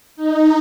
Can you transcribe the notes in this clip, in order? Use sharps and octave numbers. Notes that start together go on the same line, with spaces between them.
D#4